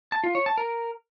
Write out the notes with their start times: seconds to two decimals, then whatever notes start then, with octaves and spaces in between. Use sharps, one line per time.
0.12 A5
0.24 F4
0.35 C#5
0.46 A5
0.57 A#4